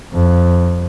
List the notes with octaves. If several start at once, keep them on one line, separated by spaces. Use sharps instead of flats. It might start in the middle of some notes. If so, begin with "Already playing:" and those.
F2